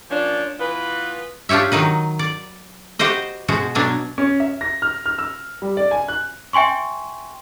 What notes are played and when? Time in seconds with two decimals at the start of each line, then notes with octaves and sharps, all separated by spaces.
0.10 F3 A#3 C#4 D4
0.60 E3 B3 F4 B4
1.49 D4 F4 G4 C#5 E5
1.72 D#3 F#3 D#4 B4
2.19 D5
2.99 F#4 G4 B4 C5 D#5
3.48 B2 G#3 F#4 C5
3.75 B2 F#3 D4 G#5 A#5
4.18 C#4
4.40 E5
4.61 A#6
4.82 F6
5.06 F6
5.19 E6
5.62 G3
5.77 D5
5.91 G#5
6.08 F#6
6.53 E5 G5 G#5 C6 C#6